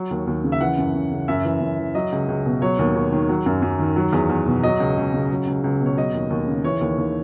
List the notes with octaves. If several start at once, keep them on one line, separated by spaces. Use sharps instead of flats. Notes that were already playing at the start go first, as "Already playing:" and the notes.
Already playing: F#3
D#2
D#2
C#3
E5
E3 F#5
F#2
F#2
C#3
F#2 E5
E3
F#2
E3
F#3 D#5
C#2
C#2
B2
F#3 C#5
D#2
D#2
D#3
F#3
F#2
F#2
D#3
F#3
E2
E2
B2
F#3 D#5
C#2
C#2
C#3
F#3
C#2
C#2
B2
C#5
F#3 D#5
D#2
D#2
C#3
E3 C#5
D#2
D#2